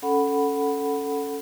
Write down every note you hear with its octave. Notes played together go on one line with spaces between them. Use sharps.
C#4 A4 F#5 B5